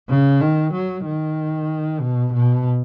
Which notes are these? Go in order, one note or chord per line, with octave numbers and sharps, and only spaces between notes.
C#3
D#3
F#3
D#3
B2
B2